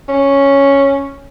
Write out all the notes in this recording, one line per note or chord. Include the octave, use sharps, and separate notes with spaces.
C#4